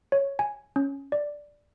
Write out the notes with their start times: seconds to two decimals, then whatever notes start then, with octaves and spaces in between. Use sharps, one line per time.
0.12 C#5
0.39 G#5
0.76 C#4
1.12 D5